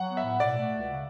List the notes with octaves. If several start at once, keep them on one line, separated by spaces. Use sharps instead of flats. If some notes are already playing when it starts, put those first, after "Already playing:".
Already playing: F#3 F#5
B3
E5
A2
B2 D5
A3
C#2
C#3